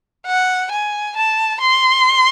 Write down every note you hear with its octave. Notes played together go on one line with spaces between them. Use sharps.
F#5
G#5
A5
C6